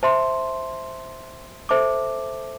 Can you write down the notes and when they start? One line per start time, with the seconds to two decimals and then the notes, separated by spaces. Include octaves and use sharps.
0.03 C5 E5 A5 C6
1.69 A4 C5 E5 A5 D6